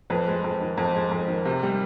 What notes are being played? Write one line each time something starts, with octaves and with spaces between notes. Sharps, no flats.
F2 B4
G#3
F2
D#3
F2
G#3
F2
D#3
C3
G3